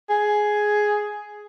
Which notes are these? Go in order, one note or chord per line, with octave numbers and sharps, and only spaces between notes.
G#4